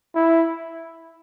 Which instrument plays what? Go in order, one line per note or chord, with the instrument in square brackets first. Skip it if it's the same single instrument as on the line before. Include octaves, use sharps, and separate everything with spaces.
[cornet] E4